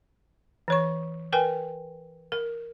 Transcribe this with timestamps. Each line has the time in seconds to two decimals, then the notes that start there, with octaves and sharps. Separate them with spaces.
0.68 E3 C#5 C#6
1.32 A#4 B4 G5 G#5
2.32 A#4